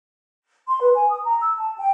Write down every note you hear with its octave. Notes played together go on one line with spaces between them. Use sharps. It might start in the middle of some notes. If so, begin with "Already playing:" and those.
C6
B4
G#5
D#6
A#5
E6
A5
G5